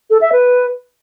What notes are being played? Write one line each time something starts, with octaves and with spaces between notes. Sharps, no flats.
A4
E5
B4